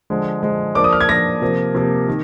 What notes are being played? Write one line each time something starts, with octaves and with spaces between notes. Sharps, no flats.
D3 F3 G#3
D3 F3 G#3
F3 A#3 D4 D6
D#6
F6
G#6
F3 A#3 D4 A#6
C3 F3 A#3
C3 F3 A#3
D#3